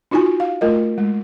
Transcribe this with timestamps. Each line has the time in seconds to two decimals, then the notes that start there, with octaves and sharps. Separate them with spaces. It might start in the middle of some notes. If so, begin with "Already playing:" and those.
0.11 D4 D#4 F4 F#4 G#5
0.40 F5
0.61 A3 F4 A#4 D#5
0.98 G#3